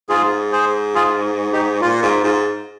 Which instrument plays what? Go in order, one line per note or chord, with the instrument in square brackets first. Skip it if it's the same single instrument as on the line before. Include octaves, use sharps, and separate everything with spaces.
[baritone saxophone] G#2 [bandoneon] F4 G#4
[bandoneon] G#4 C5
F4 G#4
D#4 G4
[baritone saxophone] A#2 [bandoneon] F4
[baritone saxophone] G#2 [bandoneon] F4
[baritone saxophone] G#2 [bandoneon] F4